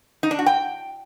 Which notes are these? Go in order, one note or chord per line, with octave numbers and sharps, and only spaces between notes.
D#4
D4
F#4
G5